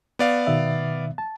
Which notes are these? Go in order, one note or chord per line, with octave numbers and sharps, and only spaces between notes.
B3 D5 F5
B2 D#3 E5
A5